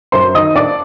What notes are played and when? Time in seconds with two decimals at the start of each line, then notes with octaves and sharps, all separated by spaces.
0.12 F#2 C5 C6
0.35 D#3 D#5 D#6
0.55 D4 D5 D6